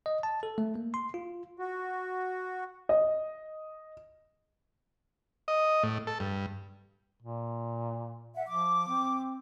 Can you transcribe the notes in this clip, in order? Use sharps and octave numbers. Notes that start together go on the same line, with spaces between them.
D#5
A5
A4
A3
A#3
C6
F4
F#4
D#5
D#5
A2
A4
G2
A#2
E5 F#5
F3 D6
C4